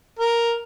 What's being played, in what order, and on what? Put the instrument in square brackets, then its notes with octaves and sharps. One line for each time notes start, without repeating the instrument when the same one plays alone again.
[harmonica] A#4